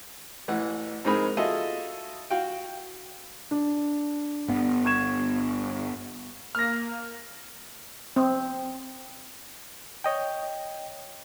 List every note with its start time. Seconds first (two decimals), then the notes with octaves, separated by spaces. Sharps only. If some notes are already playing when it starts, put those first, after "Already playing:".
0.48 A1 E3 F#5
1.05 G#2 C4 D#4 G#4 A#4 B5
1.37 F4 F#4 G#4 A4 D#5 E5
2.30 F#4 F5 G5
3.51 D4
4.48 G1 B3
4.85 C#6 G#6 E7
6.55 A#3 F6 A#6
8.16 C4
10.04 C#5 D#5 G5